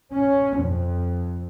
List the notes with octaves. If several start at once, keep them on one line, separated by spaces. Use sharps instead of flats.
C#4
F2